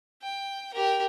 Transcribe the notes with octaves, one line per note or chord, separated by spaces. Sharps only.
G5
G4 A#4